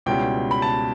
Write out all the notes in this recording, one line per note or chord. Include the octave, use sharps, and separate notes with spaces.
C#2 B2 G3 C#4 E4 G5
B5
A5